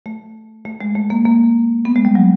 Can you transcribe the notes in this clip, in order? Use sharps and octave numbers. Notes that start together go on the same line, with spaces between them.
A3
A3
G#3
A3
A#3
A#3
B3
G#3
G3
F#3